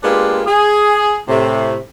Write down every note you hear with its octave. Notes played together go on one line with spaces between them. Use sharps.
G#3 A#3 B3 D4 F4 G4
G#4
A2 C3